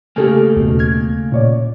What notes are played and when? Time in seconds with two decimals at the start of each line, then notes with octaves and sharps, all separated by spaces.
0.16 C#3 A3 A#3 G4 A4 G#5
0.57 D#2 B2
0.79 F6 G#6
1.32 A#2 C#5 D5